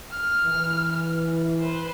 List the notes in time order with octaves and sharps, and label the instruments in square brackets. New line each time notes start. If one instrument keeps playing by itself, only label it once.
[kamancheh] F6
[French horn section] E3
[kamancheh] B4 C5